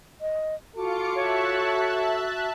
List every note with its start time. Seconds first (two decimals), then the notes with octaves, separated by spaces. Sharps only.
0.21 D#5
0.76 F4 F#4 A4 D6 C#7
1.15 C#5 E5 A5 F#6